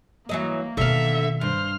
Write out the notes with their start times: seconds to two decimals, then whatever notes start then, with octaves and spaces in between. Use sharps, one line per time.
0.29 E3 F#3 A#3 D#5
0.77 B2 D3 D#3 E5 F5
1.41 G2 C5 F6